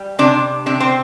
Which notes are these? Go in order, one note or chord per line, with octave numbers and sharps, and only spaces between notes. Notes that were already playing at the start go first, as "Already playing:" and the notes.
Already playing: G3
C3 D4
C3 D4
C4